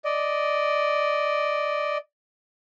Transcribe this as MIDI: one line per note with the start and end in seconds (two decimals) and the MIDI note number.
0.05 1.97 74
0.05 1.97 75